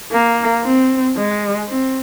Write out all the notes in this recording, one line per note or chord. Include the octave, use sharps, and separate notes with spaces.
A#3
C4
G#3
C4